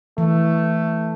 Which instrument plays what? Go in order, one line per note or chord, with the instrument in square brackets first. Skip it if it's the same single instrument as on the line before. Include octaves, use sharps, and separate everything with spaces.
[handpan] E3 [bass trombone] A3